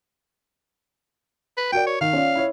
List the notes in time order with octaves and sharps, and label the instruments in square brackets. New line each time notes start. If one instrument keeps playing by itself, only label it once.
[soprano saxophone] B4
[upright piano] F#4 A#4 D5 [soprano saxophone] G5
[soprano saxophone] C#5
[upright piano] D#3 [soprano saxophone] F5
[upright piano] C#4 F4 D5
E4 C#5